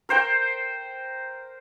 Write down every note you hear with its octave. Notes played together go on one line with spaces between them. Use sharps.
A#4 C5 G5